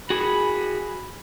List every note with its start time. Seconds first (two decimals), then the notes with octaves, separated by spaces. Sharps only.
0.10 F#4 G#4 B5